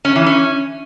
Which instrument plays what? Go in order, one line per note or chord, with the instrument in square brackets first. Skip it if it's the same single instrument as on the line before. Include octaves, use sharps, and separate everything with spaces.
[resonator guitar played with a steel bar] C#4
E3
C#4